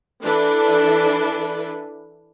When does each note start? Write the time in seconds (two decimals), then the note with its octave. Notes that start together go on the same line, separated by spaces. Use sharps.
0.23 E3 D4 A4 B4